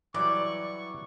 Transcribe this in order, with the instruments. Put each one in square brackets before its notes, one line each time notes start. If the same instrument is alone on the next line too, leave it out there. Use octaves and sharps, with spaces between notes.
[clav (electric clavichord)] E3 F#3 G3 [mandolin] D5 [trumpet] C#6